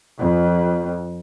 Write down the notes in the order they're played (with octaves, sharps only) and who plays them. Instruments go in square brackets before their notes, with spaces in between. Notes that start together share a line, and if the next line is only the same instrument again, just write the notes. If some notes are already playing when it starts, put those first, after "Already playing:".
[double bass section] F2